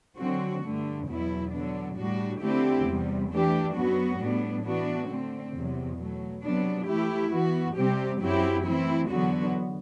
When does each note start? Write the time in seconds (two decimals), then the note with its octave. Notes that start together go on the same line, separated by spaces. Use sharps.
0.18 D3 F#3 C4 F#4
0.63 G2 D3 A3
1.08 E2 B2 F#3 B3 E4
1.52 D3 F#3 B3 D4
1.97 A2 G3 D4 F#4
2.41 D3 A3 C4 E4 G4
2.85 E2 C3 G3
3.30 E3 A3 D4 G4
3.74 F#2 F#3 B3 F#4
4.19 A2 G3 B3 D4
4.63 E3 B3 D4 F#4
5.09 D3 A3 C4
5.53 E2 C3 F#3
5.97 B2 F#3 A3
6.42 C3 F#3 B3 D4
6.86 E3 A3 E4 G4
7.31 E3 B3 F#4
7.76 C3 G3 C4 G4
8.21 F#2 F#3 C4 E4 G4
8.65 E3 A3 C4 E4
9.09 E2 D3 F#3 B3 F#4